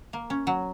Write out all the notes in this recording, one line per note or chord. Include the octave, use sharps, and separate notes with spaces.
A#3
C#4
F#3